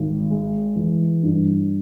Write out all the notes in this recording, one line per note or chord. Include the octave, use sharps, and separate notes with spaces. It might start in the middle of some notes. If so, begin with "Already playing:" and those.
Already playing: G#1
G#3
E3
G2